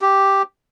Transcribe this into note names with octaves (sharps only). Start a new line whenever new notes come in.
G4